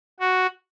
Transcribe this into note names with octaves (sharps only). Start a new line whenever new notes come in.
F#4